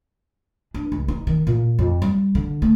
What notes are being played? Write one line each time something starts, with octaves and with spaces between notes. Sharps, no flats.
D4
C#2
D#4
D#3
A#2
F2
G3
D3
A3